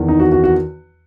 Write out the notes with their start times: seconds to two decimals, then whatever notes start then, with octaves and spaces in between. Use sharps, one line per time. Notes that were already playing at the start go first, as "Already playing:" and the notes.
Already playing: E2 D#3
0.08 D#4
0.20 F#4
0.32 F#4
0.44 F#4